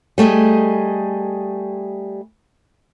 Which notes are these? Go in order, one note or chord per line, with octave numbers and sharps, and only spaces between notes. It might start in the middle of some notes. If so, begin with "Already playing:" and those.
G3 A3 G#4 D#5